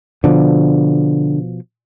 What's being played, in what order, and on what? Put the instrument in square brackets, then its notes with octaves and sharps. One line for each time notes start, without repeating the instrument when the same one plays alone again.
[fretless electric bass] B2 F3 [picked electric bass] D3